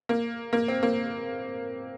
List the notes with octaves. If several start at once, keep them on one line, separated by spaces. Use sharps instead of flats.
A#3
A#3
C4
A#3